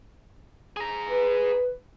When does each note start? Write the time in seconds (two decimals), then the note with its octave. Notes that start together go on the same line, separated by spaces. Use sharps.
0.77 G#4 A#5
1.09 B4